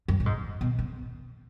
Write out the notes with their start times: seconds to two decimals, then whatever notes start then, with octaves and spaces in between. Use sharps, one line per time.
0.08 F#2
0.20 A#2
0.26 G#2
0.61 B2
0.79 C#3